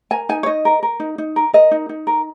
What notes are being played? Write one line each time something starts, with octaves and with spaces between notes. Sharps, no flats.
A#4 G#5
D#4 G#5
C#5
D#4 D#5
A#4
A#4
D#4
D#4
A#4
A#4 D#5
D#4
D#4
A#4